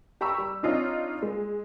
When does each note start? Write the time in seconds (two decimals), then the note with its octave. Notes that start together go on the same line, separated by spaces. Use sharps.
0.21 G4 A#5 B5 C#6 E6
0.38 G3
0.63 C4 D4 D#4 F4 C#5 D#5
1.23 G#3